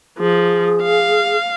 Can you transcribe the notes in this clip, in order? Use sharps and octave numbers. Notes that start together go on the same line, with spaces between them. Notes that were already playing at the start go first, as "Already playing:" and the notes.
F3 G#4
F5